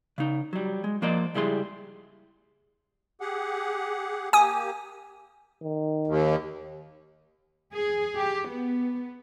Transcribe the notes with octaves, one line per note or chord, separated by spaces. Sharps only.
C#3 D#4
F#3 G3
G#3
F3 A#3 A#4 C5 D5 D#5
C#2 G3 E4 G#4 C6
G4 G#4 F#5
A#3 G4 G#5 D#6
D#3
D#2
G#4
G4
B3